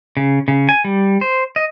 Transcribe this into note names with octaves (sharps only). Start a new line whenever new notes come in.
C#3
C#3
G#5
G3
C5
D#5